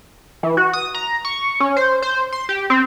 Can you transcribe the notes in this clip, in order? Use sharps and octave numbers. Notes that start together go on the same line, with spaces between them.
E3
F#4
D#6
A#5
C#6
C#4
C5
C5
C6
G4
C4